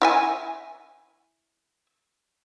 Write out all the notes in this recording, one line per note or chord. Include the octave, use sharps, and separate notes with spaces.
E4 E5 G#5